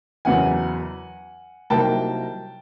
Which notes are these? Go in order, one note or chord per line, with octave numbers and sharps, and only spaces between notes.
F#1 E2 C#3 F#3 F#5 G#5
C2 C3 D#3 F#3 A#3 G5 A5